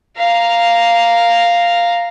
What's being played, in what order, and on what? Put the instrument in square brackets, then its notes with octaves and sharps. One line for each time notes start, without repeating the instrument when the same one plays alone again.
[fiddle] F5 A#5